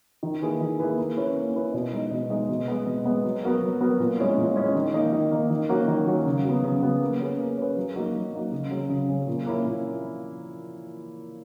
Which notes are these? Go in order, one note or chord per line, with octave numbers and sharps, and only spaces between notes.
D#3
A#3 E4 G#4 B4
D#3
A#3 E4 G#4 B4
A#3
C#4 E4 B4
A#3
C#4 E4 B4
B2
G#3 D#4
B2
G#3 D#4
B2
G#3 B3
B2
G#3 B3
F#3
B3 F#4 A#4
F#3
B3 F#4 A#4
A#2
G#3 C#4 E4
A#2
G#3 C#4 E4
D#3
A#3 D#4
D#3
A#3 D#4
D#3
F#3 A#3 C#4 F#4
D#3
F#3 A#3 C#4 F#4
C#3
F#3 B3
C#3
F#3 B3
A#3
C#4 G#4 B4
A#3
C#4 G#4 B4
F#3
A#3 D#4 F#4
F#3
A#3 D#4 F#4
C#3
F#3 C#4 G#4
C#3
F#3 C#4 G#4
A#2
A#3 C#4 E4
A#2